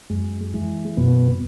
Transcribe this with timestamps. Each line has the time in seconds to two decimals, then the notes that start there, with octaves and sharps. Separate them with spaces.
0.10 F#2 G#3
0.54 E3 G#3
0.97 F#2 B2 B3